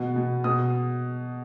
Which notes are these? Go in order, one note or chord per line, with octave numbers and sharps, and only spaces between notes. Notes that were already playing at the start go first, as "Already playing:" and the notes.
Already playing: B2 B3
B2
B2 D#6